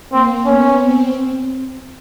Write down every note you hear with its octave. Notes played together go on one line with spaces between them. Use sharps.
A#3 C4
B3 C#4
C4